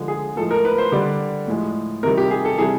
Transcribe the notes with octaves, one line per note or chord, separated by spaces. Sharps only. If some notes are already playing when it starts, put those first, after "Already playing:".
Already playing: D3 F3 G#3
G#4
A2 F3 G#3 A4
A#4
B4
C5
D3 G3 D5
A2 F3 G#3
C3 D#3 G3 A#4
G4
G#4
A4
C3 E3 G3 G#4